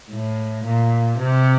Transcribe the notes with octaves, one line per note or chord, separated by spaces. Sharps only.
A2
A#2
C3